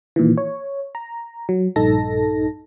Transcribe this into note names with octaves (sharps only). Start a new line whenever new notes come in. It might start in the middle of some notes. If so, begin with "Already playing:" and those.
A#2 D#3 E3
C#5
A#5
F#3
A#1 G2 D#4 A4 A5 A#6